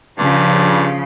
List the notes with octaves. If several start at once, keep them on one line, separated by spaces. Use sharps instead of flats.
G2 C#3 F3